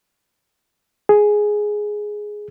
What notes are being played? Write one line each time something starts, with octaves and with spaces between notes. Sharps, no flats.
G#4